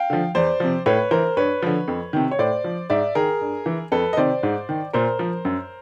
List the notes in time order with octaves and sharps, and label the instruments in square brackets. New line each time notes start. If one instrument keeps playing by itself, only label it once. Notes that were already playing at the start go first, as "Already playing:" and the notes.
Already playing: [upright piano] F5 G5
D3 F3
E2 C5 D5
C3 F3
A2 B4 C#5
E3 A#4 C5
G2 B4 C#5
D3 F3
F2
C3 D#3
C#5
A2 C5 D5
F3
G#2 D5 E5
D#3 G#4 A#4
G2
E3
F2 A4 B4
D#5
C3 D#3 C5 D5
G#2
D#3
A#2 A#4 C5
F3
F#2